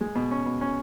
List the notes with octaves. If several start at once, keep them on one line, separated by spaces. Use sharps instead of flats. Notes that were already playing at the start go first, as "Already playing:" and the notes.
G#3
B2
C#4
B2
C#4